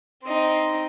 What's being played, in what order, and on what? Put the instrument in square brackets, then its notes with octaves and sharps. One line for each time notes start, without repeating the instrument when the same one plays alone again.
[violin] C4 D#4